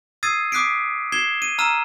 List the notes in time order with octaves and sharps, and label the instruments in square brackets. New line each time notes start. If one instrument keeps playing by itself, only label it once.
[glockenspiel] D#6 E6 G#6 A6 C7 D#7
D6 D#6 F#6 B6 C7 D7
G#6 C7 E7 G7
D#7
A#5 E6 F6 D#7 E7